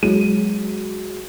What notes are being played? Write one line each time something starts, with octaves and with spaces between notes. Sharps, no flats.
F#3 G#3 D#7